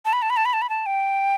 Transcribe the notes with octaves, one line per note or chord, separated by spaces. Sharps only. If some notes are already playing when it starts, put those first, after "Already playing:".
A5
B5
A5
B5
A5
B5
A5
B5
A5
G5